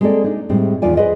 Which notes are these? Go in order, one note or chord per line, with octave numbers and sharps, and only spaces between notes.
G#3 A#3 C4 G#4 A4 D5
D4 D#4
A2 G3 G#3 C4
E2 D#3 B3 F4 D5 G#5
G#4 B4 C5 D#5